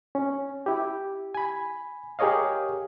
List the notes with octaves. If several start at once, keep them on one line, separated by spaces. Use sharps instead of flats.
C#4
E4 G4
G#5 B5
G4 G#4 A#4 C#5 D#5 F5